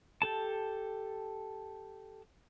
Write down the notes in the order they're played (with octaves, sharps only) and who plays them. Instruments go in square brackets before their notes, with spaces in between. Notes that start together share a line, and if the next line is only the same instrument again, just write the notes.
[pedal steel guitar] G4 A4 A5